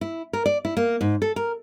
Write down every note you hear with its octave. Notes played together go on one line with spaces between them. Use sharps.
E4
A#4
D5
E4
A#3
G#2
A4
A#4